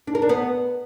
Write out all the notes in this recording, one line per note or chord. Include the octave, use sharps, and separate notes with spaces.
D4
A#4
D4
B3